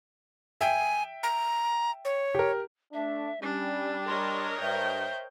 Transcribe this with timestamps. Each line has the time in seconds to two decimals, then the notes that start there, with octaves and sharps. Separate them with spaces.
0.61 E5 G5 G#5
1.23 A#5
2.05 C#5
2.35 G4 A#4
2.93 A3 D4 E5
3.42 G3 C#4 D4
4.07 A#4 C#5 D#5 C6
4.61 G2 C5 E5 G5